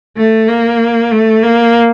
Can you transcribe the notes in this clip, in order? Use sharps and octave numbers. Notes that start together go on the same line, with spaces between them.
A3
A#3
A3
A#3